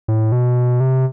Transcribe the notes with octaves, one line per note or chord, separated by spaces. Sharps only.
A2
B2
C3